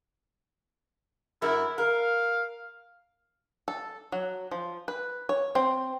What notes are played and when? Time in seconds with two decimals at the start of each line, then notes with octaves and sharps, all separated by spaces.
1.42 F#2 E4 A#4
1.78 A#4 F5
3.68 A4
4.12 F#3
4.51 F3
4.88 B4
5.29 C#5
5.55 C4